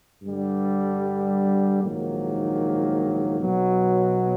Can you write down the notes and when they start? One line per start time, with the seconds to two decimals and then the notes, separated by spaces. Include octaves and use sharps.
0.23 G2 D3 G3
1.81 A#1 G#2 D#3 F#3 A#3
3.39 B1 B2 F#3